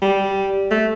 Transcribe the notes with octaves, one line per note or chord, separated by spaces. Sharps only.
G3
A3